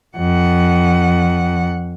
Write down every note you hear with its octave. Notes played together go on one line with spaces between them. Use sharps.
F2 F#5